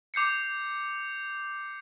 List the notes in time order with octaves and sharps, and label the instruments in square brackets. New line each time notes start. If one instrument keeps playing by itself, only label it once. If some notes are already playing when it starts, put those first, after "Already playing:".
[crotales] D6 G6 C7 C#7